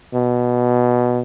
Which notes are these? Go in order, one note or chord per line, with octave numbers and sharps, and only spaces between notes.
B2